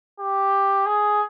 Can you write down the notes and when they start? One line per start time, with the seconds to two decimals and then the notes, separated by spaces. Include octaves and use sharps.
0.20 G4
0.86 G#4